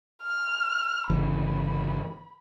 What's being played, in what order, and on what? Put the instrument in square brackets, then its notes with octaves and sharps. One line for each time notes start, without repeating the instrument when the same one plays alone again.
[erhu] F6
[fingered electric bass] G1 C#3 E3 [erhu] B5